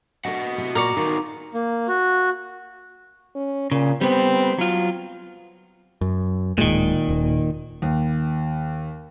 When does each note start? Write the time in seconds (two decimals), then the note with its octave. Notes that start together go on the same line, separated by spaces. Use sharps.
0.25 A3 D4 F#4 D#5 F#5
0.58 C3 B3 E4
0.75 A#2 A#4 D5 C#6
0.97 D#3 D#4 F4 F#4
1.54 A#3
1.88 F#4
3.35 C#4
3.71 A#2 C#3
4.01 G3 B3 C4
4.59 F#3 F4
6.01 F#2
6.58 D1 A#2 D#3 G#3
7.09 D#1
7.82 D#2